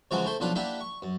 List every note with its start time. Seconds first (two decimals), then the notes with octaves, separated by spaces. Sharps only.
0.11 C#3 E3 F3 G#3 F#4 A#4
0.26 A3 E4 C5 C6
0.40 B1 F3 D4 B4 F5 F#5
0.55 A#3 D4 E4 G4 E5 F#5
0.81 C#6
1.02 F#2